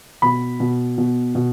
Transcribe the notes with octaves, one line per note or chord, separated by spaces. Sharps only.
B2 B5
B2
B2
B2